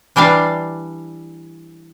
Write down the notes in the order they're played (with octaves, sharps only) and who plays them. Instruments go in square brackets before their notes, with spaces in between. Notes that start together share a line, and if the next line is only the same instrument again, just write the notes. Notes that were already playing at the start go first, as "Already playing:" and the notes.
[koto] E3 G3 D4 F5